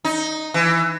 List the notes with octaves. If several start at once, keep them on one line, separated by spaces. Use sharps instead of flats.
D#4
E3